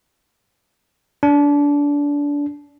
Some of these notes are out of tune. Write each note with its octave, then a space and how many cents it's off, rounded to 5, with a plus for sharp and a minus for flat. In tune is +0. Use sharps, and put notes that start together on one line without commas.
D4 -25